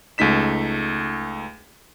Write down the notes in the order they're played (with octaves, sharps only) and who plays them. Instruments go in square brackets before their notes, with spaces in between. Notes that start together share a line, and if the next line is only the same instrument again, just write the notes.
[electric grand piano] C#2 A3 D#4 B6 E7